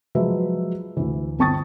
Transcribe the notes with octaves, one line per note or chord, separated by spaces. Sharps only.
F3 F#3 G#3 B4 E5
D2 E3
G1 C4 A5 C#6 D#6 A6